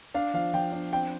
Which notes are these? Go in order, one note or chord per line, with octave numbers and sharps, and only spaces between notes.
D4 F5
F3 F5
F3 G5
D4
C4 G5